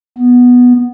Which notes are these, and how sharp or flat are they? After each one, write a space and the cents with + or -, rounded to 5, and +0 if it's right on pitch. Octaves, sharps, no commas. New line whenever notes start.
B3 -5